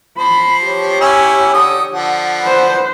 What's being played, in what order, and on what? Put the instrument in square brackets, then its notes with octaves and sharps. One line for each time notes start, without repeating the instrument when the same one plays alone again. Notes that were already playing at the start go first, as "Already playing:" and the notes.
[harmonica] F3 C5 [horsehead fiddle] B5
[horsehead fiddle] G4 C#5
[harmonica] C#4 E4
D3 D#6
D3 F3 F#5
[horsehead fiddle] B4 C5